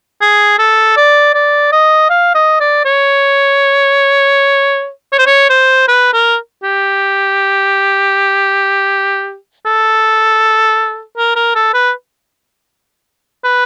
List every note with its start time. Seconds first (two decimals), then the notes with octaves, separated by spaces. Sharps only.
0.21 G#4
0.59 A4
0.96 D5
1.34 D5
1.72 D#5
2.10 F5
2.35 D#5
2.60 D5
2.85 C#5
5.12 C#5
5.19 C5
5.26 C#5
5.49 C5
5.88 B4
6.13 A#4
6.63 G4
9.66 A4
11.17 A#4
11.36 A#4
11.55 A4
11.74 B4
13.44 B4